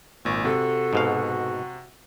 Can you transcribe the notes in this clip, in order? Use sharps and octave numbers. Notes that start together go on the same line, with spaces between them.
G#1 A#2 C#6
C3 F#4 A4
G#2 B2 F5